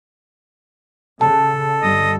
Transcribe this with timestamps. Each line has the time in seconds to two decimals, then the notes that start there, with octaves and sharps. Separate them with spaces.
1.21 C#3 A4 A5
1.82 G1 D3 G3 D#5